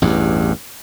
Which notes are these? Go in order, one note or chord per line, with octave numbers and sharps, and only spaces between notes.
A1 E2 G2